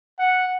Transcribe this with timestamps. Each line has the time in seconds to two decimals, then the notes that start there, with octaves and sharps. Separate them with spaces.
0.19 F#5